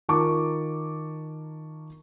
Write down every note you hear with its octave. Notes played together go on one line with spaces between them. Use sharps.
D#3 F4 A#4 A5 C#6 D6